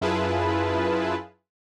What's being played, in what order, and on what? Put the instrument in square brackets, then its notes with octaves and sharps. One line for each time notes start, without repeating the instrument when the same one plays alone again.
[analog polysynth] F#2 E4 F4 G#4 B4 A5